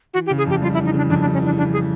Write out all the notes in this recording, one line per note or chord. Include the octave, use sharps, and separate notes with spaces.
E3 F#4
G4
C#3
G#4
F2 G4
G3 F4
E4
E3
D#4
C#3 D4
F2 D4
D4
G3
C#4
E3 D4
C#3 D4
G#4